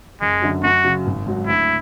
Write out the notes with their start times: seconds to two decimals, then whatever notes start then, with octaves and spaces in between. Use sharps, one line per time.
0.21 F#1 G#3
0.42 F#2 D3 F#3
0.63 F#2 F#4
0.84 C#3 F#3
1.06 G#1
1.26 G#2 F#3
1.47 D2 E4